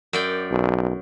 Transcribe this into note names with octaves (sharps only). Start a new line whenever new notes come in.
F#2 D5 G5
B1